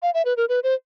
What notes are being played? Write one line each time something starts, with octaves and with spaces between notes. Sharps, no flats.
F5
E5
B4
A#4
B4
C5